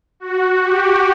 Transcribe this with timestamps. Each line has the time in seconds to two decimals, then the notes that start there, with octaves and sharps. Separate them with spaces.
0.20 F#4
0.63 G4